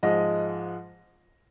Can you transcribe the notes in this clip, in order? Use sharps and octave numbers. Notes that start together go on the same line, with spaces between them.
G#2 F3 G#3 D#5